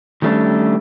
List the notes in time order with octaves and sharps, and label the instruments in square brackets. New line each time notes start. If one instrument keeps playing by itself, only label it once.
[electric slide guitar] D#3 G3 A3 C#4 D4